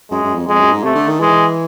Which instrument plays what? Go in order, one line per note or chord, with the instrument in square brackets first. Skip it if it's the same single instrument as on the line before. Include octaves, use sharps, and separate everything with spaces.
[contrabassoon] F#2 [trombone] G#3
[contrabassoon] F#2
F2
[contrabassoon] F2 [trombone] G#3
[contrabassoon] F#2
G#2
[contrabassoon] C3 [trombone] A3
[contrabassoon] D3
D#3
[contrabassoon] E3 [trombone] G#3